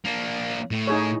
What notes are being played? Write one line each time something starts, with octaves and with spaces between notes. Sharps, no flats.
A#3 D4
A2
D#4 G#4 C#5